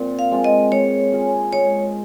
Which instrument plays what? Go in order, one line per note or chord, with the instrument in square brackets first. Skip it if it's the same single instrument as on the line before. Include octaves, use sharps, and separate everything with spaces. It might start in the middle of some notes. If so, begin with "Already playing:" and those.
Already playing: [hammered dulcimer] A#2 C4 F4
[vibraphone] F5
[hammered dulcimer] G#3 C4 F4
[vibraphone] D#5
[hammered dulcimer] G#3 [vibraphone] C#5
[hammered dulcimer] C#4 F4 G#4
[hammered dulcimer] G#3 [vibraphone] C#5